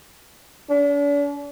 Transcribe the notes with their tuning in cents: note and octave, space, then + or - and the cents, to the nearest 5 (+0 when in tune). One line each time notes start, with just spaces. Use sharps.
D4 -45